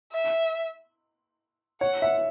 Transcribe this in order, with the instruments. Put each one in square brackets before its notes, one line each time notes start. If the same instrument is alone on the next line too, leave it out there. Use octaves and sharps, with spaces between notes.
[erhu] E5
[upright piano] C#5 [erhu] F#5
[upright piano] E5